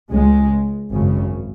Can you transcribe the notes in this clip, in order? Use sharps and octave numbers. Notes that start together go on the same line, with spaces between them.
C#2 C#3 G#3
G#1 F#2 C#3